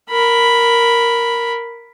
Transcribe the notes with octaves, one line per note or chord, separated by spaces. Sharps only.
A#4 B5